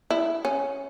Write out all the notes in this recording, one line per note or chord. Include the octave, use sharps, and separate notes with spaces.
E4
C#4